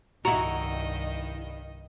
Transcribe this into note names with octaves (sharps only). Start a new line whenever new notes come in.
C2 G2 D#3 E4 F#4 D#5 A#5